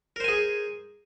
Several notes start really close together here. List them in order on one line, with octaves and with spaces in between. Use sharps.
A#4 C5 G#5 G#4